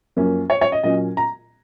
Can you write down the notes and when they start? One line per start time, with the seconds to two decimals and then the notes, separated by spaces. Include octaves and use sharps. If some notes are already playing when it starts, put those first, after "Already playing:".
0.16 F#2 F3 A#3 C#4
0.50 C#5
0.61 C#5
0.72 D#5
0.83 A#2 F#3 C#4 D#5
1.17 A#5